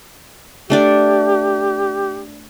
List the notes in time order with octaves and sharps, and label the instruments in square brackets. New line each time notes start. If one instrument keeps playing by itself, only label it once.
[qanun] A3 D4 D5 [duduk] G4